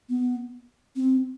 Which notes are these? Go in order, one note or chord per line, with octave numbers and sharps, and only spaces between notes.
B3
C4